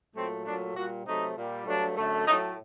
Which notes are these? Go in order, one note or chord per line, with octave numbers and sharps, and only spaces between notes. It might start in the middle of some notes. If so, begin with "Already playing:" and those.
A#2 F#3 A3 C4
A#2 F#3 A3 D4
A#2 G3 F#4
C3 F#3 A3 D#4
A#2 G3
G2 F#3 A3 D4
F#2 D3 A3
A2 F#3 A3 D#4